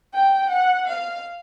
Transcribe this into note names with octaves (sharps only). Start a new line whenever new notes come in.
G5
F#5
F5